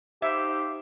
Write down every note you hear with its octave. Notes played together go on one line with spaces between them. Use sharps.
D#4 G4 C5 E5 F5